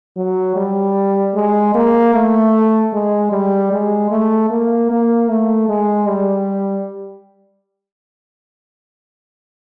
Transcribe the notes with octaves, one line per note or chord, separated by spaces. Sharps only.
F#3
G3
G#3
A#3
A3
G#3
G3
G#3
A3
A#3
A#3
A3
G#3
G3